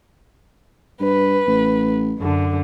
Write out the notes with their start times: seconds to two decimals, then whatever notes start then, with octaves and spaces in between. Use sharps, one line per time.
1.00 G2 B4
1.47 A1
2.20 F#2 D3